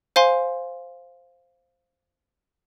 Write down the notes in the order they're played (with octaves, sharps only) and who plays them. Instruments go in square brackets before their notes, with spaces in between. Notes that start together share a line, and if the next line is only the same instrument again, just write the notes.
[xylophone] C5 F5 G#5 C6